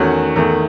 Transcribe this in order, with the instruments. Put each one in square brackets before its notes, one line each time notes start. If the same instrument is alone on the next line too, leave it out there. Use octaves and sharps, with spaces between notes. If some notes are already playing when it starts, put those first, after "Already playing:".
Already playing: [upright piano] E2 D#3 A3 C#4 F#4
E2 D#3 A3